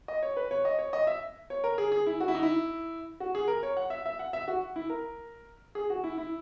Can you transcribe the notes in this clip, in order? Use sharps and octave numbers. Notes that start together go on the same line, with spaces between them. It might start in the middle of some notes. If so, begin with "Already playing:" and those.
D#5
C#5
B4
C#5
D#5
C#5
D#5
E5
C#5
A#4
G#4
G#4
E4
F#4
E4
D#4
E4
F#4
G#4
A#4
C#5
F#5
E5
E5
F#5
E5
F#4
E4
A#4
G#4
F#4
E4
E4